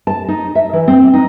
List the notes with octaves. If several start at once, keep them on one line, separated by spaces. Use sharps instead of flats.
A5
D#4
E5
E3
C4
D#4